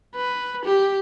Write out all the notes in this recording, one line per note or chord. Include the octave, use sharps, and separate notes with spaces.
B4
G4